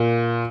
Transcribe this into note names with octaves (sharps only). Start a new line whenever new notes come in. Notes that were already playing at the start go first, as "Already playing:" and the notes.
Already playing: A#2